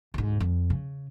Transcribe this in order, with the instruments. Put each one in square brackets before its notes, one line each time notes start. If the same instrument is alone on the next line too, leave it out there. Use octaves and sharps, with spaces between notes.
[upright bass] D2 G#2
F2
C#3